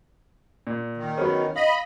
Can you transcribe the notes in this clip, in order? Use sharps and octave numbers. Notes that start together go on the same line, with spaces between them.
A#2
D#3
F#3 B3 C#4
D#5 F5 B5